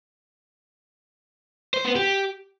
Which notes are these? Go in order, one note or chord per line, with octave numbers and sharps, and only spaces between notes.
C5
B3
G4